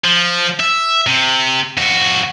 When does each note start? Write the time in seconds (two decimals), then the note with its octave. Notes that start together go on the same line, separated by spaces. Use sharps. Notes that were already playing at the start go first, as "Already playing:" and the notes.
0.05 F3
0.60 E5
1.07 C3
1.78 F2 F#4